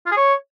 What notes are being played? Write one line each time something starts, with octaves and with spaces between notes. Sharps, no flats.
F4
G#4
C#5